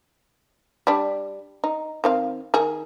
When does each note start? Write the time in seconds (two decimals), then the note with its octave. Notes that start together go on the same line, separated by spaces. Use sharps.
0.87 G3 D4
1.64 D#4
2.04 D#3 C4 F5
2.54 D#3 D#4 G#4